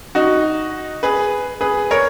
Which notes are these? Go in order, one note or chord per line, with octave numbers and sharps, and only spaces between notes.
D#4 F#4
G#4 B4
G#4 B4
A#4 C#5